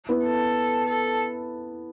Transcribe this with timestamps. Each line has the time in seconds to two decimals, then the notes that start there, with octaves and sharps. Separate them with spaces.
0.09 B3 E4
0.25 A4
0.89 A4